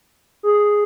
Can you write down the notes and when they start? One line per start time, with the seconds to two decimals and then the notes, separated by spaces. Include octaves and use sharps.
0.43 G#4